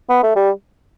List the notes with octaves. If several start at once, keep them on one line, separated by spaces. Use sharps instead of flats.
B3
A3
G3